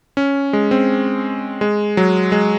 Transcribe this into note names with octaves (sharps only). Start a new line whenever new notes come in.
C#4
G#3
C4
G#3
F#3
G#3